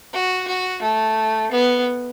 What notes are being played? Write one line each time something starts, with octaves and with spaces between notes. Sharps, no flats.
F#4
F#4
A3
B3